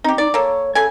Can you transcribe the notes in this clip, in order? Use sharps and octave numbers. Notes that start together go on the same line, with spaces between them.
C4 D#4 G4
D#4 D5
A#3 A4 C#5
C#3 A4 G#5